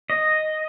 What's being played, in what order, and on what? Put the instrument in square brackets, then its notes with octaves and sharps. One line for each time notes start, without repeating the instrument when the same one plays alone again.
[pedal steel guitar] D#5